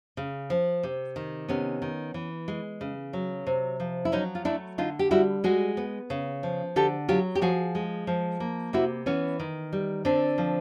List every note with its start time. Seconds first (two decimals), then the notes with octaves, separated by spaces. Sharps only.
0.17 C#3
0.50 F3
0.83 C3
1.16 D#3
1.48 C3 B3 C#4
1.82 D#3
2.14 E3
2.48 G#3
2.81 C#3
3.13 F#3
3.47 C3
3.80 F3
4.05 E4
4.12 F#3 C#4 D#4
4.35 F4
4.45 A3 D4 E4
4.78 D3 D#4 F4
4.99 G4
5.11 G3 E4 F#4
5.44 G#3 F#4 G#4
5.77 B3
6.10 C#3
6.43 F3
6.76 D3 G4 A4
7.08 F#3 F4 G4
7.35 G4
7.42 F3 F#4 G#4
7.75 G#3
8.07 F3
8.40 A#3
8.73 C3 E4 F#4
9.06 E3 B3 C#4
9.40 D#3
9.73 G3
10.05 D3 C4 D4
10.38 F3